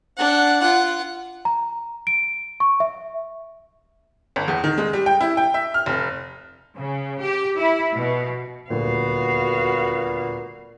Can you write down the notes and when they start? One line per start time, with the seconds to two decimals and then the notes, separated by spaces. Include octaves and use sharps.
0.17 D4 F#5
0.60 F4 F#5
1.45 A#5
2.07 D7
2.60 C#6
2.80 E5
4.36 G1
4.48 E2
4.64 D#3
4.78 G#3
4.93 G3
5.06 G5
5.21 E4
5.37 G5
5.54 E5
5.74 F6
5.86 F1
6.76 C#3
7.20 G4
7.59 E4
7.96 B2
8.70 D#1 D2 A#2 B3 F#4 F5